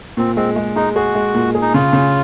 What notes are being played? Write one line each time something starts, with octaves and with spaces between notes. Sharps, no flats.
A#2 C4
G#3 C4
G#3
G#3 D#4
F#4 G#4
G#3
A#2
G#4
D#4
C#3 F4
C#3